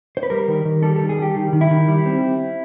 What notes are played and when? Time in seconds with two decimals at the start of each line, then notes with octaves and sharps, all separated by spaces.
0.17 C5
0.23 B4
0.30 G3 A#4
0.48 D#3
0.65 D#3
0.83 G3 A4
0.96 A4
1.01 D#3
1.09 G#4
1.18 G3 G4
1.36 D#3
1.53 D#3
1.61 E4
1.71 D#3
1.88 G3
2.06 C4